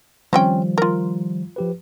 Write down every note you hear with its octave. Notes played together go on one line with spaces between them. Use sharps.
D#3 F3 G3 C4 C#4 G5
F4 A#4
F3 G4 B4